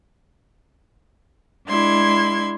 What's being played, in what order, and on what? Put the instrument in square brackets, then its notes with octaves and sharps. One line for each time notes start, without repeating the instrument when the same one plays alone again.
[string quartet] G#3 D4 E4 C6 G#6